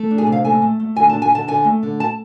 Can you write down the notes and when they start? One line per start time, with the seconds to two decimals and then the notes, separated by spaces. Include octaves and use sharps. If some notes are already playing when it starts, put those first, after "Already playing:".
Already playing: A3
0.11 D4
0.18 G#4
0.27 C3
0.32 F5
0.45 A3 G#5
0.62 A3
0.80 A3
0.96 D3 G#5
1.09 A5
1.13 D4
1.22 G#5
1.31 D3 A5
1.48 D3 G#5
1.65 A3
1.83 D3
2.00 A5